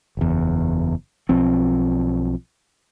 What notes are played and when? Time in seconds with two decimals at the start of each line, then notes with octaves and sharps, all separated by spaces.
0.17 F#1 E2
1.29 B1 F3 C4